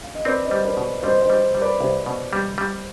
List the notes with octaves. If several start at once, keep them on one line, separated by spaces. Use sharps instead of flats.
F5
D#5
C4 B4 D5
C5 D#5
G3
B4 D5
B2
G3 C5 D#5
C5 D#5
G3
G3
B4 D5
C2
B2
G3
G3